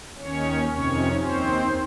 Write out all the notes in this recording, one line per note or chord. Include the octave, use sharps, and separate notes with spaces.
D#2 D#3 C#4 C#5
F2 C3 D#3 C#4 C#5
D#2 D#3 C4 C5